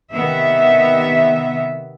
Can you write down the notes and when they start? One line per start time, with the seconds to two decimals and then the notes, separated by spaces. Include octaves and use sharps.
0.13 C3 D#3 B3 E5